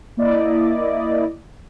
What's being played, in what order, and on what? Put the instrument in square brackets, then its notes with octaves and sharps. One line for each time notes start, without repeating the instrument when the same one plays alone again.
[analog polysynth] A#3 E4 D5 D#5